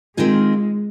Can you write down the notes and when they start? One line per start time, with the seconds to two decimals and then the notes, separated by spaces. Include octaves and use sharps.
0.17 C3 D#3 G#3 C4 F4 G#4